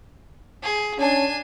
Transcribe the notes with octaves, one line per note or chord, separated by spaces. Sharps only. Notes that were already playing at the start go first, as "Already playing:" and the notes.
G#4
C#4 D4 G#5